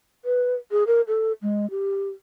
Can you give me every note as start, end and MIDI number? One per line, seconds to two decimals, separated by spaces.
0.25 0.55 71
0.71 0.84 68
0.87 1.01 70
1.08 1.32 69
1.42 1.69 56
1.70 2.09 67